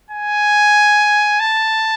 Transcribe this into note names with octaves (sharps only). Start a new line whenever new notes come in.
G#5
A5